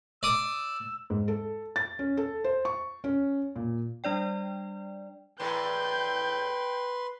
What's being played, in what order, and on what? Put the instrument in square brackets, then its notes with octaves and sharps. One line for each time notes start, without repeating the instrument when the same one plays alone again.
[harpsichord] D5 D#6 [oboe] E6
[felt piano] G#2
A4
A6
C#4
A4
C5
C#6
C#4
A#2
[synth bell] G3 D4 D5 G5
[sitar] E2 A2 [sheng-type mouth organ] B4 C6 [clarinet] G5 [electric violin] G6